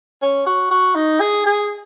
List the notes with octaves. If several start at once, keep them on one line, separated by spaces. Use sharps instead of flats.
C#4
F#4
F#4
D#4
G#4
G#4